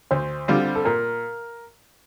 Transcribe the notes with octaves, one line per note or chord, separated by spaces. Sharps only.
D2 C5
D3 G3 C4 F4
A4
A#2 A#4